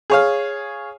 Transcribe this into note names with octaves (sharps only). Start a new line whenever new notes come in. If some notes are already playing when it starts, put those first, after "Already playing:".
G#4 C#5 F5